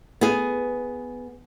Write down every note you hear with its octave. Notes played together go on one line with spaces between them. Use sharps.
B3 G#4